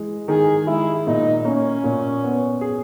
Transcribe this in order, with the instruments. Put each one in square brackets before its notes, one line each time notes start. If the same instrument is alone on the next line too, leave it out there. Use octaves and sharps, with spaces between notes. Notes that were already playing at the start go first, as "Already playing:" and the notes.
Already playing: [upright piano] E3 G#3
[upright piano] D#3 [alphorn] G#4
[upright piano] G#3 [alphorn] E4
[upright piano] A#2 [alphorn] D#4
[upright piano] A#3 [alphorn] C#4
[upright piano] A#2
B3
G#4